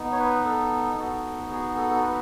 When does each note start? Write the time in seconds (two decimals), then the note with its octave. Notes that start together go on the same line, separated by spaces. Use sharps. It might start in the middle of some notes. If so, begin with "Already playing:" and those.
Already playing: B3 D#4
0.12 C#5
0.19 B4
0.45 A4
0.98 B3 D#4 F#4
1.50 G#4
1.76 A4
1.90 A4
2.02 B4